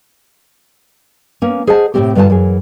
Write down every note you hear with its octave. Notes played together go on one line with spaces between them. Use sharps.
A#3 B3 C#4
G#4 C5 D#5 F#5 A5
A2 C3 A3 A#3 C4 G4
G2 D3 G3 F4 G#5 A5
F#2 E3 G#4